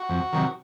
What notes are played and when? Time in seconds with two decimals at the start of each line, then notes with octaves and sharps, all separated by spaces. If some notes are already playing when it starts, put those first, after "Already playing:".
Already playing: F#4
0.09 F2
0.33 C3 D#3 F#3